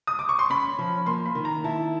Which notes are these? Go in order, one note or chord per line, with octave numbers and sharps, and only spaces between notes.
D#6
D6
C#6
C6
C#4 B5
F3
A#3 C6
B5
D#3
A#5
E4 A5